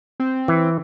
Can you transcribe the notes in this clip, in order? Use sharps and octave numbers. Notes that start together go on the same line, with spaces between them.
C4
E3